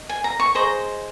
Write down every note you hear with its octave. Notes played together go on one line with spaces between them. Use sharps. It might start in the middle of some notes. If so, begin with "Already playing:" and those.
Already playing: D#5
G#5
A#5
C#6
G#4 C5 D#5 A#5